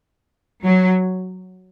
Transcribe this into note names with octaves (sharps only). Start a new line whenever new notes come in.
F#3